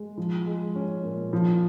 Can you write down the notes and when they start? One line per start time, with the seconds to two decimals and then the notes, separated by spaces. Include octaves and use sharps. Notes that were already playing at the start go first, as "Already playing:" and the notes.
Already playing: G#3
0.17 F3
0.46 G#3
0.76 C#4
1.03 A#2
1.33 F3